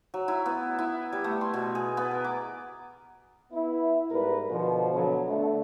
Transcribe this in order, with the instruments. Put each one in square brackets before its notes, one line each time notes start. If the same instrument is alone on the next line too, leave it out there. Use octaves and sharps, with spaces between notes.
[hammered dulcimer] F#3
E4
B3
E4
G3
A3
C6
B2
G#4
B3
A#4
D6
[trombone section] B3 E4
G#2 G3 A#4 B4
B2 D3 F3
B2 D3 F3 F#3 B3
D3 A3